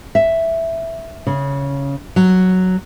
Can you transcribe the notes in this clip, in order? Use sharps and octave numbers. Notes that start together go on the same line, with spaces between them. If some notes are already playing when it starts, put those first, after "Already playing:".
E5
C#3
F#3